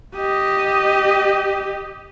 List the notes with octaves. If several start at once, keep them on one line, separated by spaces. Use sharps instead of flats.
G4 D#5